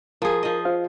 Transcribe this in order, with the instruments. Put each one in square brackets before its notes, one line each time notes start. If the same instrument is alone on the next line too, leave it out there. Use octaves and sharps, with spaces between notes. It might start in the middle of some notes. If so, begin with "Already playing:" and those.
[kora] F3 G#4 [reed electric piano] A#4
[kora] F3 D#5
[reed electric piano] F4 C5 F5